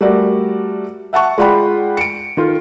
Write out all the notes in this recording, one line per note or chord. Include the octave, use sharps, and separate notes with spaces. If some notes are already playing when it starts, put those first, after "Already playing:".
G3 A3 F#4 A#4 D5
E5 F#5 A5 C#6
G#3 F4 D5 F#5 G5 B5
C#7 D7
D#3 F4 A4